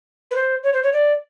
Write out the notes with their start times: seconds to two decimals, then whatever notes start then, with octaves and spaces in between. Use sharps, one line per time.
0.31 B4
0.36 C5
0.64 C#5
0.73 C5
0.83 C#5
0.93 D5